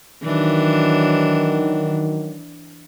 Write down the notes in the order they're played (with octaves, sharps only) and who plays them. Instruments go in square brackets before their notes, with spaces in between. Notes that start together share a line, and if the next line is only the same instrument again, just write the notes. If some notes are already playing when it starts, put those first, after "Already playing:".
[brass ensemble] D#3 F#3 [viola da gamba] E3 D4